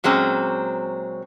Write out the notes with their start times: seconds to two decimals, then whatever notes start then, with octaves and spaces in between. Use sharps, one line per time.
0.04 A#2 F#3 G#3 C4 C#4